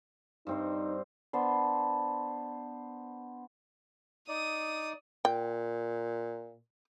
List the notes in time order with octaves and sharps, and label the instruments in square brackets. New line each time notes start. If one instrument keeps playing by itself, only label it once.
[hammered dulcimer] G2 C4 C5 [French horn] D#4
[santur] B3 D4 C5
[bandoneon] D#4 D5 [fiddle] D#6
[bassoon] A#2 [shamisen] G5